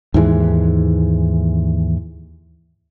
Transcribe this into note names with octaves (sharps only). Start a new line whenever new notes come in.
D#2 G#2 E3 G#3